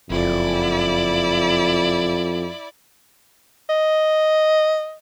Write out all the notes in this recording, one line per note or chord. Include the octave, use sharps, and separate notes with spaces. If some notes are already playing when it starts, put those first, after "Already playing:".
F#1 F2 E4 D5
D#5